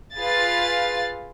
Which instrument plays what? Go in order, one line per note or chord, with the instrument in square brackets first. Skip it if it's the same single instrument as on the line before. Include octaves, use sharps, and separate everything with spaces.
[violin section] F4 G#4 B4 F5 A6